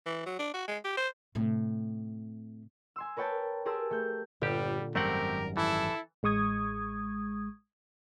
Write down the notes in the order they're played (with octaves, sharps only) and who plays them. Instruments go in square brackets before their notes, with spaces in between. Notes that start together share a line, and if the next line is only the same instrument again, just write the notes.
[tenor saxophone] E3
F#3
D4
F#4
G#3
G4
C5
[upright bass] A2 C3
[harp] G#5 C6 E6
A#4 B4 C#5 G5 A5
G4 G#4 A#4 C5 A5 E6
A3 G6
[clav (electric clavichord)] G1 G4 [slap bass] A#2 D3 [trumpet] G3
[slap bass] G#1 F#2 G3 [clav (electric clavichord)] A3 C4 F#5 [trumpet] G4 [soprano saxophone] A#4
[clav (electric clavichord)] E3 [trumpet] E4 [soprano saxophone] A4
[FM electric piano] A1 G#3 C#6 D#6 G#6